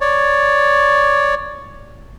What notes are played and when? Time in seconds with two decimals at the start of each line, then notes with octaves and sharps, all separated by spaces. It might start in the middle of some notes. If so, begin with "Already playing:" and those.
0.01 C#5 D5